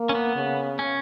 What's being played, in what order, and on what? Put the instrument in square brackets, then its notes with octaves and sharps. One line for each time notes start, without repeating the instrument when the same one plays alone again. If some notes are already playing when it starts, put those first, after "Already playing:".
Already playing: [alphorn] A#3
[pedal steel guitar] C#4
B3
[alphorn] C#3
[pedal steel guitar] C#4